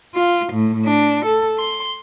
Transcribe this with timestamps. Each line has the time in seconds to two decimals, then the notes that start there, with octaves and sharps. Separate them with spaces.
0.14 F4
0.52 A2
0.86 D4
1.25 A4
1.59 C6